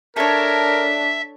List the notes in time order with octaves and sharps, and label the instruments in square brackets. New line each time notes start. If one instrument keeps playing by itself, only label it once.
[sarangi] D4 [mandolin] A4 C#5 [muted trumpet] A#4 [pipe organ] E5